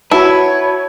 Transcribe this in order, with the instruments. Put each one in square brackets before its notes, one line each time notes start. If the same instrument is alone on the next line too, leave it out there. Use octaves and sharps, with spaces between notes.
[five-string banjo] E4 [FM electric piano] F#4 A5 [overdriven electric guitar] B4 [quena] C#5